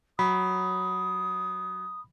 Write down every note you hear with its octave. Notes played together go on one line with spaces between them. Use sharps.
F#3 B5 D#6